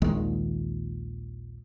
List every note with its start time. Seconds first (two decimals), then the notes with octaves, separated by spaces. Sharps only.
0.02 A#1 D#2 D#3 G#3